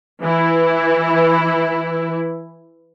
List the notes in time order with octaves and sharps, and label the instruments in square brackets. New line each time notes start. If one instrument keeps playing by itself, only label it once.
[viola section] E3 E4